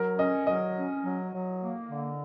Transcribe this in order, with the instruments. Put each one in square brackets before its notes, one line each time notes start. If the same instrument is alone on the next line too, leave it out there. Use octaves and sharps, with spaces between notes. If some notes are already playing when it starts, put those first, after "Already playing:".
Already playing: [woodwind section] F#3 [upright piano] A#4
[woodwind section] C#4 [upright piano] D#5
[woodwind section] F#3 [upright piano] D#5
[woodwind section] C#4
F#3
F#3
A#3
D3